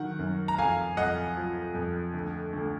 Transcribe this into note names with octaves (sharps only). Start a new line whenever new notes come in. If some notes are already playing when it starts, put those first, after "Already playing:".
Already playing: D#3 F#3 F#5
F#2
A#5
F2 F5 G#5
F2 D#5 F#5
F3
F2
D2
D2